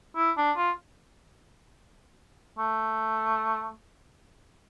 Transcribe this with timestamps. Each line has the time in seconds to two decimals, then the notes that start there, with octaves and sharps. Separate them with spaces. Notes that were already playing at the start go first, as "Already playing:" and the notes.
0.17 E4
0.37 D4
0.57 F4
2.58 A3